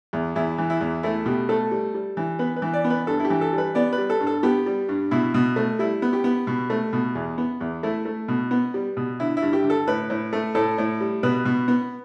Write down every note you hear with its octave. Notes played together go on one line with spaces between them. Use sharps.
E2
E2 E4
E3
E4
E2
A3 E4
B2 G4
A3 A4
G3
G3
E3
B3 B4
B4
E3
D5
B3
B4
G2 A4
E4
G4
E3
A4
G3
B4
B3 D5
B4
G3
A4
G2
A4
B3 G4
G3
G2
B2 E4
B2
A3
G3 E4
B3
G4
B3
B2
A3
B2
E2
B3
E2
A3 E4
A3
B2
B3
G3
B2
D3 E4
E4
G2
G4
D3
A4
A2 B4
A2
A3
A2 A4
A2
G3
B2 B4
B2
B3